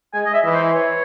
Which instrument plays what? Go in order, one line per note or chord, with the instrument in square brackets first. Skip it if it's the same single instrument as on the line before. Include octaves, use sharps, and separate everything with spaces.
[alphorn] G#3 [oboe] G#5
[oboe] D#5
E5
[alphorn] E3
[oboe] C5
C#5